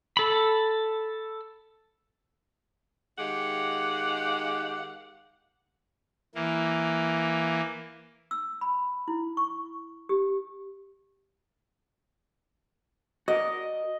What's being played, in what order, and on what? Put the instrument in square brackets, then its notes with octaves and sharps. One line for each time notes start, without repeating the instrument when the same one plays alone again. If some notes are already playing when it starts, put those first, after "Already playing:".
[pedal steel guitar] A4 B5
[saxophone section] D#3 G#3 D#4 G4 F5 F#5
[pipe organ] E3 A#3
[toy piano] E6
B5
E4
C#6
G4
[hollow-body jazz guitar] F#4 A#4 D5 [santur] D#5